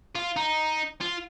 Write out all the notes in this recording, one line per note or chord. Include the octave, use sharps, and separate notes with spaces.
F4
D#4
F4